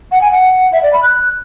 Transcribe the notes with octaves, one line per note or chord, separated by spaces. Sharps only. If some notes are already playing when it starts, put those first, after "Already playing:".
F#5
G#5
F#5
E5
D5
B5
F#6